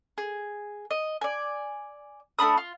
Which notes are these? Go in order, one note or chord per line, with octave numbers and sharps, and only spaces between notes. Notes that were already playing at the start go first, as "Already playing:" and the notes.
G#4
D#5
D5 G#5
A3 D4 B5 D#6
F4